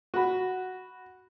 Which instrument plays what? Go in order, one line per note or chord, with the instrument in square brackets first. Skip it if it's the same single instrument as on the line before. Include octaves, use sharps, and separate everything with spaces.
[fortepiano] F#4 B5